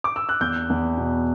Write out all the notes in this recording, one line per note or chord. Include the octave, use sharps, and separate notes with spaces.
D6
E6
F#6
E2 G6
E2
B2